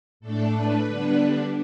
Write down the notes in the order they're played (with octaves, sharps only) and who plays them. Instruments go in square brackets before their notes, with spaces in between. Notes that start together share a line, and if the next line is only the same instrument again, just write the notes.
[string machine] A2 A3 D4 A4
B4
D3 G3 B3 D4